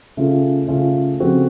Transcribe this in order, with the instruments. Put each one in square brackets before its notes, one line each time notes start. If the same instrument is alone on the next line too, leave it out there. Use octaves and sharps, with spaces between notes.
[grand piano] C#3 A3 C#4 F4 A4
C#3 A3 C#4 F4 A4
C#3 F3 C4 F#4 A4